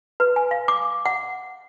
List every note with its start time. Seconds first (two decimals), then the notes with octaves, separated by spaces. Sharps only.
0.20 B4
0.36 G#5
0.51 F5
0.68 D6
1.06 F#5